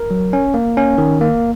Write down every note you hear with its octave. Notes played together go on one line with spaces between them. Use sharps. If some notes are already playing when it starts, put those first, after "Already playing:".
Already playing: A#4
F#3
C#4
A#3
C#4
D#3
A#3